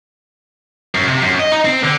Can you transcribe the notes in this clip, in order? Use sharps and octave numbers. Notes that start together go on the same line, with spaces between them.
F#2
C3
F#2
D#5
D#4
C4
D3